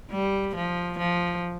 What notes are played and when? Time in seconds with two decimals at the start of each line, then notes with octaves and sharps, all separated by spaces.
0.11 G3
0.55 F3
0.99 F3